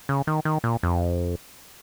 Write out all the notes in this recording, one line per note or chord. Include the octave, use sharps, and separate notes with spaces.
C#3
D#3
D#3
A#2
F2